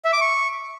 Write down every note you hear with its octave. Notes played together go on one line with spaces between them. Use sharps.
E5
D6
C#6